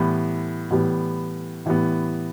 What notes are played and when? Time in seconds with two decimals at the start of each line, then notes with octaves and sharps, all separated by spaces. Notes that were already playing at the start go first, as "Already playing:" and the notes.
Already playing: A2 E3 G3 B3
0.71 A2 E3 G3 B3
1.66 A2 E3 G3 B3